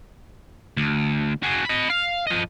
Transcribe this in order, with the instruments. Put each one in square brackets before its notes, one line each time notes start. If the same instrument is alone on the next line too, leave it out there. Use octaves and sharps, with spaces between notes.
[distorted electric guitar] D2
F#4 G#4
D#5 B5
F5
F3 D#5